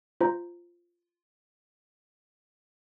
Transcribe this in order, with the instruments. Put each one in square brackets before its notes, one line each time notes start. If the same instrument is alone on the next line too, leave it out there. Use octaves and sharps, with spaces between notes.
[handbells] F4 C5 A#5